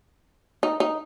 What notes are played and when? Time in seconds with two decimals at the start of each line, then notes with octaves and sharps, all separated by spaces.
0.63 D#4
0.80 D#4